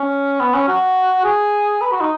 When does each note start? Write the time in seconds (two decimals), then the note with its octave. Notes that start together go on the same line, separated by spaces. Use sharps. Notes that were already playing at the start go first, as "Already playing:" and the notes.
Already playing: C#4
0.40 B3
0.54 C#4
0.68 F#4
1.25 G#4
1.82 B4
1.92 F#4
2.01 D#4